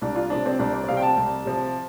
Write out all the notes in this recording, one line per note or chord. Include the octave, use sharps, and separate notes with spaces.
C2 D4
F4
C3 F3 D4
C4
C2 D4
D5
D5
C3 F3 F5
G5
A5
C2
C3 F3